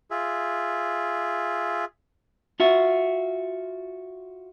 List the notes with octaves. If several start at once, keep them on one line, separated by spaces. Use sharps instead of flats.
F4 G#4 E5
F4 F#4 E5